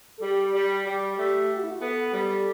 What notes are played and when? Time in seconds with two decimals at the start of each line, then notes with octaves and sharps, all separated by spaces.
0.18 A4
0.22 G3 G4
0.54 G3
0.85 G3 G4
1.18 A3
1.50 G4
1.57 F#4
1.64 E4
1.71 F#4
1.81 B3 A4
2.12 G3